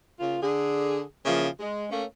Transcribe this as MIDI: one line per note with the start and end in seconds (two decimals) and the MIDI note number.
0.19 0.38 49
0.19 0.38 58
0.19 0.38 65
0.42 1.02 50
0.42 1.02 68
1.24 1.47 49
1.24 1.47 52
1.24 1.47 53
1.24 1.47 58
1.60 1.86 56
1.90 2.04 57
1.90 2.04 58
1.90 2.04 61